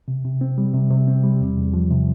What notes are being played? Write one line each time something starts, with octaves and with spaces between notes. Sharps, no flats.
C3
C3
C4
G3
C3
C3
C4
G3
E2
E2
F3
C3